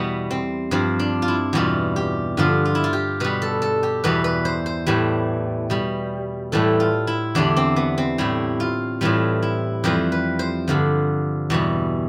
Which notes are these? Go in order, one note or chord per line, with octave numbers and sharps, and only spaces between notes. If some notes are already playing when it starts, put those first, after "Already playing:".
Already playing: E2 B2 G3 B3
C4
G2 F3 C4
D4
F4
E4
E2 B2 G3 F4
G4
G2 D3 F3 F4
F4
E4
F4
G4
B2 G3 B4
A4
A4
G4
E2 B2 G3 B4
B4
C5
C5
A2 E3 G3
B2 G3
A2 E3 G3 A4
F4
E4
E2 D3 G3 D4
C4
B3
C4
A2 G3 E4
F4
A2 E3 G3 F4
E4
F2 E3 G3 C5
B4
C5
G2 D3 F3
E2 B2 G3